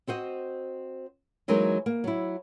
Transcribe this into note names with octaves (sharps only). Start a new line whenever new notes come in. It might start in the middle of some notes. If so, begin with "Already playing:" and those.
C4 F#4 C5 D#5
E3 F#3 G#3 A#3 D#4 A#4
A#3
F#3 E4